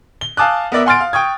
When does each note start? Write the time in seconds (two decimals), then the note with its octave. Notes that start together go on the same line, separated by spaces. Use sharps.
0.21 G7
0.37 F5 G#5 A5 D6 D#6 F#6
0.72 B3 A#4 D5 E5
0.86 F#5 G#5 C6 F6 A6 D7
1.01 F5
1.13 G5 C#6 D#6 G#6